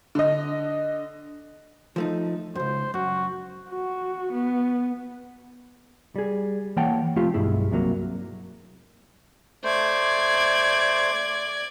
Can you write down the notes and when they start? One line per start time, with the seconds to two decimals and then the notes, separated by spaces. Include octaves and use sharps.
0.15 D3 D#5
1.96 F3 A3 D#4
2.55 C#2 F#2 C5
2.94 F#2 F#4
3.69 F#4
4.32 B3
6.16 G3 G#4
6.77 E3 A#3 C#5 F#5 G5 A5
7.16 F3 A3 C4 F4 G4
7.34 B1 G2 E4 G#4
7.71 C2 C3 F#3 A#3
9.64 A3 C5 D5 G#6